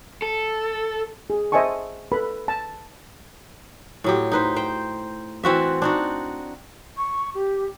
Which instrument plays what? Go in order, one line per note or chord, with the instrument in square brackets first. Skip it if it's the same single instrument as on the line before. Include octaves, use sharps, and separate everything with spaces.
[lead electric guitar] A4
[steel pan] G#4
C5 D#5 E5 G#5 A5 C#6
A4 B4 B5
A5
[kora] A2 F#3 G4
D#4 B4 C5
C5 G5
E3 C4 F#4 E5
D4 D#4 F#4
[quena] C#6
G4